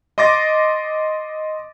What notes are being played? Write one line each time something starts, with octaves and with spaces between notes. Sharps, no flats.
D#5 C6 D6 A6 A#6